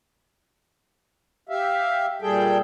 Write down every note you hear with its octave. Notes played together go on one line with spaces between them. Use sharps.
G4 E5 F5
A#2 G3 G#4 A4 G5